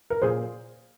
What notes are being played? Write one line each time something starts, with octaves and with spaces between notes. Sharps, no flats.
A#4
A#2 G#4 C5